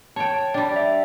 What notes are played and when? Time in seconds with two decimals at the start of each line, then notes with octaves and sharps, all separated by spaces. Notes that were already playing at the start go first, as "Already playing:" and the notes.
0.16 C#5 G5 A5
0.54 G3 D4 G5
0.76 E5